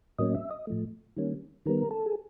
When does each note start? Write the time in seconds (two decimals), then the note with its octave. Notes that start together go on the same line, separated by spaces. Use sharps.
0.19 A2 F#3 A#3 C#4 D#5
0.35 E5
0.51 D#5
0.67 A2 F3 A3
1.17 D#3 G3 A#3 C#4
1.66 D#3 G3 B3 A#4
1.91 A4
2.06 G#4